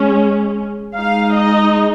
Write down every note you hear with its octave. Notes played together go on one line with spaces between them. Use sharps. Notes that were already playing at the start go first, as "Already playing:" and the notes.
Already playing: G#3 C#4
G#3 D#4 F5
D#5